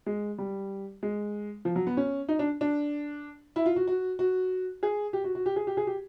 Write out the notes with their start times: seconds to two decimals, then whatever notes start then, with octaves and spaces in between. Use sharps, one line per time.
0.06 G#3
0.38 G3
1.03 G#3
1.65 F3
1.76 F#3
1.87 B3
1.97 C#4
2.29 D#4
2.39 D4
2.61 D4
3.56 E4
3.66 F4
3.76 F#4
3.88 F#4
4.19 F#4
4.83 G#4
5.13 G4
5.24 F#4
5.35 F#4
5.46 G4
5.56 G#4
5.67 G4
5.77 G#4
5.87 G4